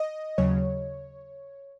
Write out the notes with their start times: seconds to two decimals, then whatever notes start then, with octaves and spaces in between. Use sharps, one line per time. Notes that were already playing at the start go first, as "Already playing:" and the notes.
Already playing: D#5
0.38 D#2 C#3 F#3 C#5